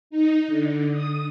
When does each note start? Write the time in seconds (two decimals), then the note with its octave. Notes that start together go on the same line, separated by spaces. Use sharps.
0.10 D#4
0.48 D3
0.91 D#6